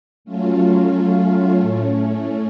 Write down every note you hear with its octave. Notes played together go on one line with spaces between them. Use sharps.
F#3 A3 C#4 F4
A2 A3 C#4